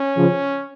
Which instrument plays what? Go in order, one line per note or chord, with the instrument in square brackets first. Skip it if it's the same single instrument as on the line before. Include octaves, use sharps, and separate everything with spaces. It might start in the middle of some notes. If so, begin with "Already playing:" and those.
Already playing: [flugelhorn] C#4
[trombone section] C#3 F3